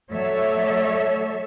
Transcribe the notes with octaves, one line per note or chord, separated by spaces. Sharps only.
F#3 A3 A4 C#5 D5 E5